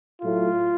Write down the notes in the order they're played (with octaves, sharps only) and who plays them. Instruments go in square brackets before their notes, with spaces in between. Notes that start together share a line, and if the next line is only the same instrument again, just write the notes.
[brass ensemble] A2 F#3 A3 F4